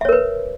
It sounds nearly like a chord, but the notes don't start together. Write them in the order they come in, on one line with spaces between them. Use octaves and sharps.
E5 C#5 A#4 B4